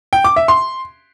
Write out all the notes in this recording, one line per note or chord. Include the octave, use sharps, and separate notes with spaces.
G5
D6
E5
C6